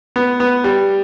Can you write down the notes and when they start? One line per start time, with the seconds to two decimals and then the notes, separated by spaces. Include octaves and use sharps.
0.16 B3
0.40 B3
0.64 G3